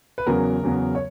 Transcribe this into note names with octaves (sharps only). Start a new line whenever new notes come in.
B4
E2 C#3 F#3 B3 A#4
E2 C#3 F#3 B3
C#5